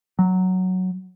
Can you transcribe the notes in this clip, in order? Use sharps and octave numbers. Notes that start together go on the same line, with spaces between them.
F#3